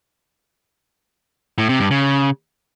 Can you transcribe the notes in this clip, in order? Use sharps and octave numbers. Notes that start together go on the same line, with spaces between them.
A2
C3
G2
C#3